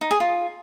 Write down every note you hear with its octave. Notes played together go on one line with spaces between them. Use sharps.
D#4
G#4
F4